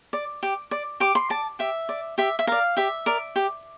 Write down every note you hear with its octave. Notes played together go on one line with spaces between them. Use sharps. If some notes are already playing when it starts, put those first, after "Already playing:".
D5
G4
D5
G4 D6
C6
D5 A5
G4 E5
D5
G4 E5
E5
A#4 D5 F5
G4 E5
A#4 D5
G4